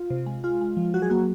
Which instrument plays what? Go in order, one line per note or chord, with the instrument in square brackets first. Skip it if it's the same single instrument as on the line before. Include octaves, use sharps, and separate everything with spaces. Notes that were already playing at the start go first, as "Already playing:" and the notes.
Already playing: [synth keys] F4
C3
G#3
G#3 F4
G#3
F3
F#3 F#4
G#4
A#3 F#4